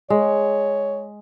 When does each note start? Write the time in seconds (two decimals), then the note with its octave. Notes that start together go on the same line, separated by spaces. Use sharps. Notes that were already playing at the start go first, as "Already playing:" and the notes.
0.10 G#3 C#5